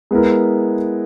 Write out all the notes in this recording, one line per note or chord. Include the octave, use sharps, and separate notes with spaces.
G#3 B3 E4 A#4